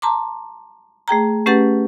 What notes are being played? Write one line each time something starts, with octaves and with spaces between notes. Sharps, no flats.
A5 A#5 C6 D6
A3 G#4 G5 A#5
A3 C#4 G4 B4 F#5 A6